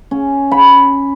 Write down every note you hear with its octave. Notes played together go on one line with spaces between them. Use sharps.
C#4
B5